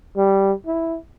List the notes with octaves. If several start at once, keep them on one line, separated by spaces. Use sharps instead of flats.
G3
E4